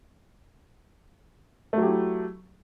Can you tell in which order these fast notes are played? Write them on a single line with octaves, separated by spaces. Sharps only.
A3 F#3 G4 E4